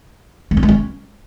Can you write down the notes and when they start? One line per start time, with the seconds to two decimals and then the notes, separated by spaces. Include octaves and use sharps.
0.51 A3
0.57 C#4
0.63 G#3
0.69 C#4